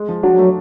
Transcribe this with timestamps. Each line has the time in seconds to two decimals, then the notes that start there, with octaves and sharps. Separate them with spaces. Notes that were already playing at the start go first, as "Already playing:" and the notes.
Already playing: G#3
0.09 F3
0.23 F#3 D4
0.38 A3